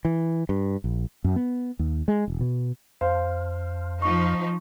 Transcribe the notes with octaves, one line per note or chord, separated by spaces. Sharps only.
E3
G2
A#1
F#2
B3
D#2
G#3
E1
B2
F2 C5 F5
F3 D#4 C#6